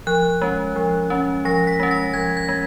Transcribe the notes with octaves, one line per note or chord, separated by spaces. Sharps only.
F3 F#6
G#3 C#4
F3
G#3 C#4
F3 A#6
B6
G#3 C#4
A#6
F3 G#6
G#6
G#3